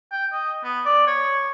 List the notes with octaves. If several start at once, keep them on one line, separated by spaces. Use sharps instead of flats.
G5
D#5
B3
D5
C#5